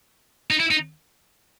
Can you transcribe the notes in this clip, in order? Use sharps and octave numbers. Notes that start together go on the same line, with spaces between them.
D#4
E4
D#4